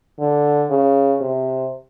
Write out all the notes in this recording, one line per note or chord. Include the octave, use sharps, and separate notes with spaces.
D3
C#3
C3